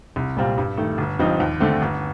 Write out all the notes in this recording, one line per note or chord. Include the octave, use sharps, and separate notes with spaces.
C2
A#2 G3 C4 F4
G2
D#3 A3
G1
G2 F3 C4 D#4
D#2
D3 A3 C4
G1